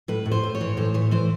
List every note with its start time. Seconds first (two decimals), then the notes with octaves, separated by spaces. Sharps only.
0.08 A2 B4
0.26 A2
0.31 C5
0.43 A2
0.55 C#5
0.61 E3
0.77 A2 C5
0.94 E3 C#5
1.11 E3 C5